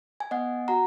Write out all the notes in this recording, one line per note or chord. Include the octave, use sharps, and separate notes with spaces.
G#5
B3 D#5 F#5
F#4 F#5 A#5